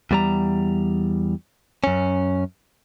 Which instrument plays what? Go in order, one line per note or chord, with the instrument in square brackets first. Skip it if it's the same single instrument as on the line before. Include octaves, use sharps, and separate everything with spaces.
[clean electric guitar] E2 G3 A#5
F#2 C#4